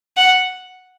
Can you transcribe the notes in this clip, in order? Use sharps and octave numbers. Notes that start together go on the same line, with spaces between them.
F#5